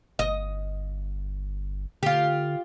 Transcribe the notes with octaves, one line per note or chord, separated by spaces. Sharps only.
G1 D#5
D3 F4 G4